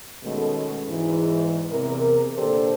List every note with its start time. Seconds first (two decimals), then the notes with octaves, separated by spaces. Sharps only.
0.23 B2 D#3 G#3 A3 C#4 A4
0.87 E2 G#2 E3
1.70 E2 C3 A#4
2.37 A#2 D3 G4 A4 C5 D5